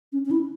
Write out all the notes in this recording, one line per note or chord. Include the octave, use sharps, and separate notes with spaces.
C#4
C#4
E4